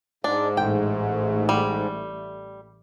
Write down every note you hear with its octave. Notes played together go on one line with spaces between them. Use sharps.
G#2 D4
A1 A3 G5
G3